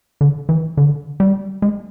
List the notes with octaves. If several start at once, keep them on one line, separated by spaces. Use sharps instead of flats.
D3
E3
D3
G3
G#3